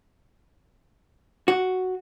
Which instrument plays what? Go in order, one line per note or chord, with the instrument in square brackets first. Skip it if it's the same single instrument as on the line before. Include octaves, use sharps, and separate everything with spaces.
[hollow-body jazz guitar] F#4